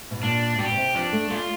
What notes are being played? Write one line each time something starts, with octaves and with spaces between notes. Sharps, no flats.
B2
A#2 D4
B2 G4
B2
C3
F3 D4
A3
A3 F4